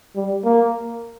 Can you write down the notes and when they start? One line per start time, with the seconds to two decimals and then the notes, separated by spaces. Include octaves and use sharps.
0.16 G3
0.45 A#3